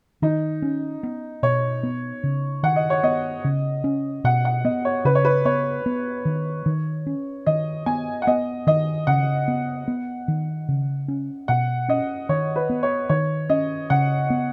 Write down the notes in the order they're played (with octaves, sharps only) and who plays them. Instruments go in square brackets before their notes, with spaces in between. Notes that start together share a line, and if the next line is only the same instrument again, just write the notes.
[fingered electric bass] D#3 [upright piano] D#4
[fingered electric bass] C#4
B3
[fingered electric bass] B2 [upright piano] C#5
[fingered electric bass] B3
C#3
[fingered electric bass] D#3 [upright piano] F#5
[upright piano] D#5
C#5
[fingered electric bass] B3 [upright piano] D#5
[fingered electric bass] C#3
C#4
[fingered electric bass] B2 [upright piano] F#5
[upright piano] F#5
[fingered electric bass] B3 [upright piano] D#5
[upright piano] C#5
[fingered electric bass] C#3 [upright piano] B4
[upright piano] C#5
B4
[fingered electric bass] B3 [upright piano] C#5
[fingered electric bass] B3
D#3
D#3
C#4
[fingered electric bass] D#3 [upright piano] D#5
[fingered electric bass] B3 [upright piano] G#5
[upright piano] F#5
[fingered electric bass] B3 [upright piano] D#5
[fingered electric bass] D#3 [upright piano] D#5
[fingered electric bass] C#3 [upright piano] F#5
[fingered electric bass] B3
B3
D#3
C#3
C#4
[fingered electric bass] B2 [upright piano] F#5
[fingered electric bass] C#4 [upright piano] D#5
[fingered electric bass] D#3 [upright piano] C#5
[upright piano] B4
[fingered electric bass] B3
[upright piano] C#5
[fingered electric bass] D#3 [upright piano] C#5
[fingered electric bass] C#4 [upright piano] D#5
[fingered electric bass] C#3 [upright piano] F#5
[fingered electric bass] B3